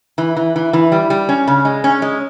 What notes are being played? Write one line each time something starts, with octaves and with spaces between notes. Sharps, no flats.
E3
E3
E3
E3
G3
G3
C#4
C#3
G#3
C#4
G#3